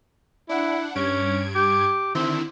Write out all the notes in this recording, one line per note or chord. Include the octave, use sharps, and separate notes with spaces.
D4 E4 F#5
G2 C#4 G#6 D7
G4
D3 D#3 C4 E4